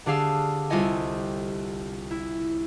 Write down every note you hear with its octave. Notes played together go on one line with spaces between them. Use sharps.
D3 D4 G4 G#4 F5 E6
C2 F4 G4 A4 D#5 G#5
E4